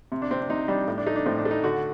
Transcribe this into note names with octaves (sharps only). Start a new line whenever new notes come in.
C3
D4
C3 C4
D4
C3 D#4
G3 D4
A2
D4
A3 D#4
D4
A2 C4
D4
A3
D#4
D3 F#4